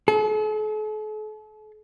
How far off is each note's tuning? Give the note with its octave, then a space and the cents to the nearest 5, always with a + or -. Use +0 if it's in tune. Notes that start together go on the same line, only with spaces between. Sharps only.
A4 -45